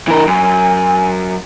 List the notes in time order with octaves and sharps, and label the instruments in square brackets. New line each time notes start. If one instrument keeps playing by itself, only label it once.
[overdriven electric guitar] E3 A#4
[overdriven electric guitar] F#2 [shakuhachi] G#5